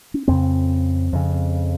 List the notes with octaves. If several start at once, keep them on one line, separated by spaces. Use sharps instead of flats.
C#4
F2 C#3 C4
F2 C#3